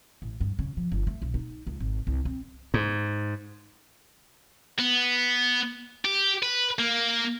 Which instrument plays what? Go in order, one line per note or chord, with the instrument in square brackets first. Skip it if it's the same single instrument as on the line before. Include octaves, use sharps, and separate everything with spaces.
[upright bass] A1
G2
C#3
F3
G1
A3
B1
D#4
C#2
G#1
C2
C4
[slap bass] G#2
[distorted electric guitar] B3
G4
B4
A#3